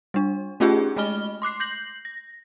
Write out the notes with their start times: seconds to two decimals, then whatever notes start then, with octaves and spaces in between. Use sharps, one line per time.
0.14 G3 D4
0.60 A3 C#4 D#4 F4 G4 G#4
0.96 G#3 A3 D#5 B5 F6 G7
1.42 C6 D6 F#6 C7
1.60 G6 A#6 C7 F#7
2.05 A#6